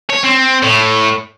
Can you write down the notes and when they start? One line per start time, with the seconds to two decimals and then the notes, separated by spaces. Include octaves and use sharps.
0.10 C#5
0.24 C4
0.63 A2